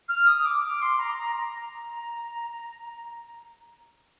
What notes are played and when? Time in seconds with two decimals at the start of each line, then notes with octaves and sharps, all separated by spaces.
0.08 F6
0.26 D#6
0.39 D#6
0.45 D6
0.63 D6
0.81 C6
0.99 A#5
1.18 A#5
1.35 A#5